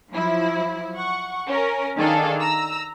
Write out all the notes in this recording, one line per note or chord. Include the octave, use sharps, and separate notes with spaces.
F3 F#3 E4
F#5 C#6
C#4 A#4
D#3 D4 G#4 A4 F5
A#5 E6